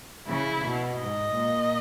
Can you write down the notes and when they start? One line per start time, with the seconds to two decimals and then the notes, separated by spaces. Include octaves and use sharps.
0.28 C#3 E4
0.63 B2
0.98 G#2 D#5
1.34 A#2